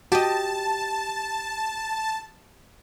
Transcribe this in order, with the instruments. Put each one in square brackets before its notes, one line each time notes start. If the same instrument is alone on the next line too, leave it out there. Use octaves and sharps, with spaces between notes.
[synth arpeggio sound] F#4 [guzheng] G4 D#5 [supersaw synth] A5